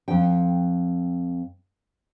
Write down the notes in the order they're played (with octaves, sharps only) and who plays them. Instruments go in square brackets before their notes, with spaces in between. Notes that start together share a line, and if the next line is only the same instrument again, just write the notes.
[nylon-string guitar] F2 G5